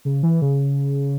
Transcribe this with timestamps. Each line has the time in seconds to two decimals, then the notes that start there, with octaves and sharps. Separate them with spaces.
0.05 C#3
0.23 E3
0.42 C#3